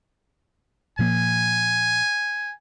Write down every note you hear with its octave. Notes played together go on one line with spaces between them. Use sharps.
A#2 F3 A#3 G#5